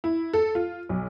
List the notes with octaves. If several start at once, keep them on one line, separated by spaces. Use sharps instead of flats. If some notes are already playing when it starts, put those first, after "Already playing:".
E4
A4
F4
B1